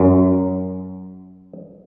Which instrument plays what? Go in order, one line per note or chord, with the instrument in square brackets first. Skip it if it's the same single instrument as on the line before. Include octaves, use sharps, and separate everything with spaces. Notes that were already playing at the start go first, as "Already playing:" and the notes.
Already playing: [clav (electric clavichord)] F#2